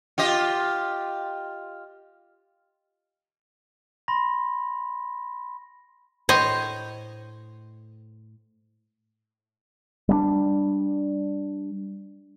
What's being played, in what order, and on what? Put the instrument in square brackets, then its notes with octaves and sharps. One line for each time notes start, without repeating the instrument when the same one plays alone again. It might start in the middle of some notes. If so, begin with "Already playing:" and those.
[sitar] F4 G4 D#5
[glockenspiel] B5 C6 A#6
[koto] A2 C#5 D#5 [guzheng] C5
[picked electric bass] G3 B3 D4